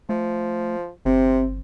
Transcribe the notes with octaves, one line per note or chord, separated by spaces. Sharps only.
F3 A3
G1 C3 C4